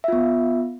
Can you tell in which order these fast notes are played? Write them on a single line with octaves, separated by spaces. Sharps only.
E5 F4 B3